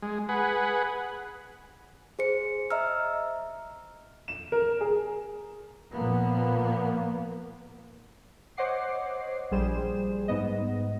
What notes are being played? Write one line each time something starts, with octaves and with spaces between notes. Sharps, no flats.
G#3
G#4 B4 F#5
G#4 C5 C#7
D#5 E5 A#5 E6 F6
E7
A#4
G#4
A#2 F3 A#3 B3
C5 C#5 D#5 F#5 D6 C7
A#1 G3 G#4 C5 E7
G#2 B3 D#5